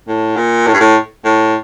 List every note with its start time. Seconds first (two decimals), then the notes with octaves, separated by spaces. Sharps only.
0.08 A2
0.37 A#2
0.67 A2
0.73 G2
0.80 A2
1.25 A2